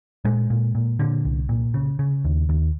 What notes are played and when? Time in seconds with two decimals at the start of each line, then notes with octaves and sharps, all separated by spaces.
0.25 A#2 G#3
0.50 A#2
0.75 A#2
0.99 A#2 D3
1.25 C2
1.49 A#2
1.74 C#3
1.99 C#3
2.24 D#2
2.49 D#2